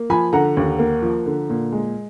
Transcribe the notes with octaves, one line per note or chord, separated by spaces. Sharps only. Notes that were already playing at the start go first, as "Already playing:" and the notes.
Already playing: A#3
F3 G#5 B5
D3 F#5 A#5
D#2
A#3
F3
D3
A#2
G#3